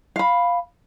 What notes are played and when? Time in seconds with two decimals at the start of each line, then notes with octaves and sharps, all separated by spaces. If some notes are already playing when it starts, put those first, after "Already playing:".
0.16 F5 B5